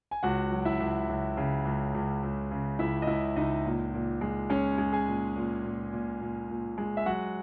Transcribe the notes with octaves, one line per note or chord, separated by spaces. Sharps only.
G#5
C#2 F#4 F#5
F#3
E4 E5
C#2
C#2
C#3
C#2
C#2
C#2
C#3
C#2 E4 E5
D#5
C#2 E4 E5
C#2 D#4 D#5
A#2
A#2
G#3
G#3 C#4 C#5
G#3
G#4 G#5
A#2
A#2
A#2
A#2
A#2
A#2
G#3
E5
F#3 F#4 F#5